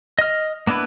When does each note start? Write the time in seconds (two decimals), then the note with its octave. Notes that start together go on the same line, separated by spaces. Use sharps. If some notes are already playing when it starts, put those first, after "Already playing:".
0.19 D#5 F6
0.67 A#3 B3 D4 E4 B4